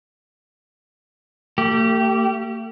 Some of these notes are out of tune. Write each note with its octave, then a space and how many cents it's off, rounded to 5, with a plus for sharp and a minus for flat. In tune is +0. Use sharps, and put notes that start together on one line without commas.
A3 +45 G4 -15